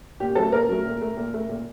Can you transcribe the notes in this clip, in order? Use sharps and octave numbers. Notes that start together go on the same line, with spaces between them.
A#2 G4
F#3 A3 A4
A#2 A#4
F#3 A3
A#2
A3
A#2
A3
A#2